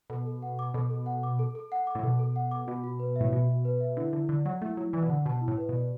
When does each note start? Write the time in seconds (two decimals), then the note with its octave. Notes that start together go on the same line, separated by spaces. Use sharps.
0.10 B2 A4
0.26 A4
0.42 F#5
0.59 D6
0.74 B2 A4
0.90 A4
1.06 F#5
1.23 D6
1.39 A4
1.55 A4
1.72 F#5
1.87 D6
1.95 A2
2.03 B2 A4
2.19 A4
2.36 F#5
2.51 D6
2.68 B2 F#4
2.84 F#4
2.99 B4
3.16 E5
3.21 A2
3.32 B2 F#4
3.48 F#4
3.65 B4
3.81 E5
3.97 D3 E4
4.13 D3 E4
4.29 D3 D5
4.45 F#3 F#5
4.62 A3 E4
4.77 F#3 E4
4.93 E3 D5
5.02 B2
5.09 D3 F#5
5.26 B2 A5
5.41 E4
5.48 A2
5.57 B4
5.69 B2
5.74 D5